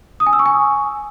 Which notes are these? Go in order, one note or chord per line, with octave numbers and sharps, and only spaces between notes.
D#6
G#5
E6
C#6
G#5